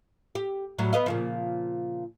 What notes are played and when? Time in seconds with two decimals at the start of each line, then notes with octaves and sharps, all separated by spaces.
0.35 G4
0.79 A2 F#3 G3
0.93 B3 D#5 F5
1.06 A#2 C#3 F3